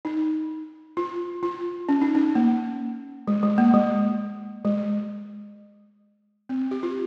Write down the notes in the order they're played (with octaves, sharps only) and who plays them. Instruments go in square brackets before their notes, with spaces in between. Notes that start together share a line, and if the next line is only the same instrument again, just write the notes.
[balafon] D#4
F4
F4
C#4
D#4
C#4
A#3
G#3
G#3
A#3
G#3
G#3
C4
G4
F4